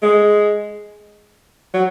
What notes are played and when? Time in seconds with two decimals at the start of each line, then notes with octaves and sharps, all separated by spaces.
0.02 G#3
1.74 F#3